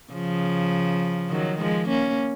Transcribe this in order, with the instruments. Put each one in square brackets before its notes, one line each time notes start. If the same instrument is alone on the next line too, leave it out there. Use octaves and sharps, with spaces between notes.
[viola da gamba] C#3 F3
D#3 F#3
F3 G#3
A#3 C#4